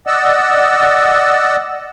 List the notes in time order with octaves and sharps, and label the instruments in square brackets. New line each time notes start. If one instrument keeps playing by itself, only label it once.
[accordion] D5 D#5 F#5 E6